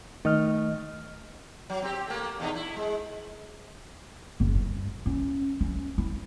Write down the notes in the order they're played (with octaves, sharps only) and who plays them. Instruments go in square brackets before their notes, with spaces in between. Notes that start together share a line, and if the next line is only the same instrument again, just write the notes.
[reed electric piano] D#3 D#5 F6 [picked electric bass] A3
[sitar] F#3
C4 G4
A3 A#3
E2 B2 D#4
E4
G#3
[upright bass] F#1
G2
C#4
C#4
E4